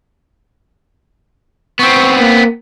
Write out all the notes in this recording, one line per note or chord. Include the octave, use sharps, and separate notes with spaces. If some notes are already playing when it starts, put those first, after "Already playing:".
B3 C4 C#6
A#3